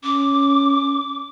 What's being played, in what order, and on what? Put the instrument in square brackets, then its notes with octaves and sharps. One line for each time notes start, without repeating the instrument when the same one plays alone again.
[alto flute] C#4 [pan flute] D6